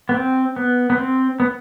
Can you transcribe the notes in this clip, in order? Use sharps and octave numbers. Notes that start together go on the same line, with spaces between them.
B3
C4
B3
B3
C4
B3